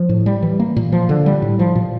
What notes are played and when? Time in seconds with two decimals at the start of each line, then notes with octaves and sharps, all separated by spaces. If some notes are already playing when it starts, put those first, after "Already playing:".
Already playing: F3
0.09 A2
0.26 G3
0.43 E3
0.60 A#3
0.77 A#2
0.92 F3
1.09 D3
1.26 G3
1.42 A2
1.59 F3
1.75 A#2